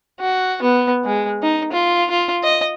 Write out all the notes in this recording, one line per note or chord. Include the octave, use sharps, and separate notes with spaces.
F#4
B3
G#3
D#4
F4
F4
D#5